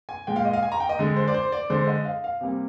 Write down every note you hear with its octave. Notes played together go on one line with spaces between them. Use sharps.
G#5
A#2 G#3 G5
F5
D#5
F5
G#5
A#5
G5
D#5
D3 G#3
C5
D5
C5
D5
D3 G#3 C5
D#5
F5
F5
C3 G3 A#3